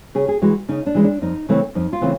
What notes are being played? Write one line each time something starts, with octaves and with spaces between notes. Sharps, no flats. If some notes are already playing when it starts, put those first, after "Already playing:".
C#3 G#4
G#4
E3 G#3 F#4
C#3 D#4
D4
E3 G#3
D4
F2 D#4
C#3 E3 A3 C4
F2 D#4
F4
C#3 E3 A3 C4